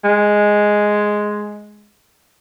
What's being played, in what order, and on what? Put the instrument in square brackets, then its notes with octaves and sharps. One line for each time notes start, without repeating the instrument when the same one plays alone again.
[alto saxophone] G#3